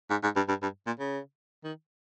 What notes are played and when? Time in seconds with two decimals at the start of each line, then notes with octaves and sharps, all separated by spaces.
0.10 G#2
0.24 G#2
0.37 G2
0.48 G2
0.62 G2
0.87 A#2
1.00 C#3
1.64 D#3